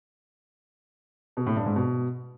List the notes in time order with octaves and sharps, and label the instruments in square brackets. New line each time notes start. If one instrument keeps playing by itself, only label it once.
[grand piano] B2
A2
G2
G#2
B2